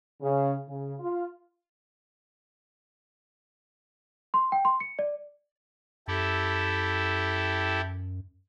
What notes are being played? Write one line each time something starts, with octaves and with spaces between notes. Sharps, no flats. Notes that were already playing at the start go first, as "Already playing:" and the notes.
C#3
C#3
F4
C6
G5
C6
C#7
D5
F#2 E4 G4 A4